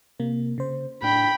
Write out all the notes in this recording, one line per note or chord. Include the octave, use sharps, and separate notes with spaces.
C3 A#3
C#3 C5
A2 D4 G5 B5